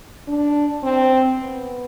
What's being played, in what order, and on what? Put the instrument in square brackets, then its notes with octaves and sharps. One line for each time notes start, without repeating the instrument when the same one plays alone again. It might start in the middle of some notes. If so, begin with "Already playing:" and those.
[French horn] D4
C4
B3